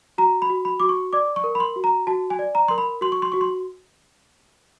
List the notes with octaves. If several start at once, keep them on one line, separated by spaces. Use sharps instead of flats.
F#4 A#5
B5
F#4
B5
F#4 D6
C#6
D5 D6
C#6
A#4
B5
C6
F#4
A#5
F#4 A5
G#5
D5
A#5
A#4 C6
B5
F#4 C6
C#6
C6
F#4 C#6
C6